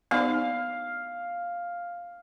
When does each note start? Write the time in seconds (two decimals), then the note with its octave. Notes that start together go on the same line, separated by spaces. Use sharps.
0.11 B3 D#4 F5